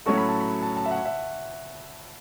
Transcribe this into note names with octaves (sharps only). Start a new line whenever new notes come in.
A2 F#3 C#4 F#4 A4 C#6
B5
A5
B5
A5
A5
E5
F#5
E5